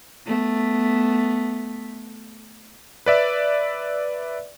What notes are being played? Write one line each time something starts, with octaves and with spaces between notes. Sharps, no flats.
A3 B3
B4 D5 E5